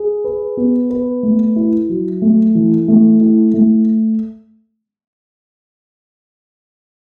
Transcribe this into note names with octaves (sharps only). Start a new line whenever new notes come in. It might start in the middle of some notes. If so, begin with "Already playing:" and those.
Already playing: G#4
B4
B3
B4
A3
E4
F#3
A3
E3
A3
E4
A3